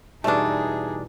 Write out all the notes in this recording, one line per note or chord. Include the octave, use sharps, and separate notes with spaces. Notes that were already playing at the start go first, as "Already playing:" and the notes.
E2 B2 G3 A3 D4 D#4 G#4